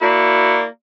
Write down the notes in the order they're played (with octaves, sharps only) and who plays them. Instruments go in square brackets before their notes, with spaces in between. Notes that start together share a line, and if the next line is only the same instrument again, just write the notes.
[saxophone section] A#3 E4 F#4 D5